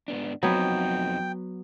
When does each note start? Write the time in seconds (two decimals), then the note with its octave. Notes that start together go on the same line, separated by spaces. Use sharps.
0.08 G#2 B3 D4
0.43 F2 F#3 B3 C4 D#4 G5